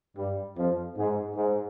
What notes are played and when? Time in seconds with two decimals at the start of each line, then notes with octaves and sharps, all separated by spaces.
0.16 G2 G3
0.57 F2 F3
0.97 G#2
1.36 G#2